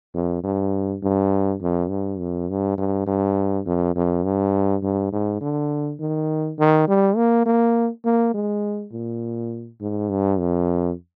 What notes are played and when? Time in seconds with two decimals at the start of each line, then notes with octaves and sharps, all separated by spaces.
0.14 F2
0.44 G2
1.03 G2
1.61 F2
1.90 G2
2.20 F2
2.49 G2
2.78 G2
3.07 G2
3.66 F2
3.96 F2
4.24 G2
4.83 G2
5.13 G#2
5.41 D3
6.00 D#3
6.59 D#3
6.88 G3
7.17 A#3
7.46 A#3
8.05 A#3
8.34 G#3
8.92 A#2
9.81 G#2
10.10 G2
10.39 F2